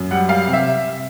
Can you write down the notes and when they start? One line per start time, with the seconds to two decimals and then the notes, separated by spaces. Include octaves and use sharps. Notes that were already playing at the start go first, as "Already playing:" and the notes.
Already playing: F#2
0.11 G3 F#5
0.28 G3 F5
0.47 C3
0.53 E5